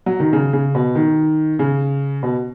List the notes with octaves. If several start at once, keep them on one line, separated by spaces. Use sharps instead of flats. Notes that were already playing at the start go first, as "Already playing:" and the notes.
F#3
D#3
C#3
C#3
B2
D#3
C#3
B2